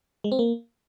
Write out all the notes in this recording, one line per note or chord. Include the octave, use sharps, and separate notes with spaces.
G#3
C4
A#3